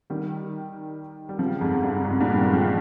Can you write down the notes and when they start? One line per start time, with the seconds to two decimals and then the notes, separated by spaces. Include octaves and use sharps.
0.10 D#3 G3
1.29 G3
1.39 C#3 F3
1.61 F2 G#2
1.83 G2
2.05 F2 G#2
2.20 G2 A#2
2.37 D#3 G3
2.53 F3 G#3